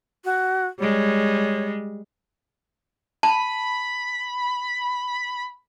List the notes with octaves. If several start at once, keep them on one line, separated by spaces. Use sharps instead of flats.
F#4
G3 G#3 C#5
A5 B5